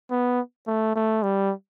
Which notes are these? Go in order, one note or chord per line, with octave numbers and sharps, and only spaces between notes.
B3
A3
A3
G3